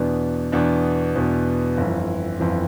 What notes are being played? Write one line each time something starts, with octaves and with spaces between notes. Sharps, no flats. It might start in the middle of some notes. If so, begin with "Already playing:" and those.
Already playing: E2 B2 B3 D4
E2 B2 B3 D4
E2 B2 B3 D4
G1 F2 E3
G1 F2 E3